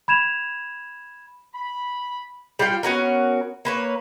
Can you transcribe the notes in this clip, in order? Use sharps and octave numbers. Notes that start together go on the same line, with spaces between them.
B5 G#6 E7 F7
B5
G3 F4 F5 G5
B3 C#4 F#4 A#4
A#3 B4 C#5